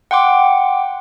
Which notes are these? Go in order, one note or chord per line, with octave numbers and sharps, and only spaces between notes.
F#5 G5 C6 D6